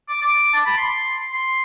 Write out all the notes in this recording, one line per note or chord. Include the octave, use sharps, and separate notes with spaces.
D6
D6
A5
B5
C6
C6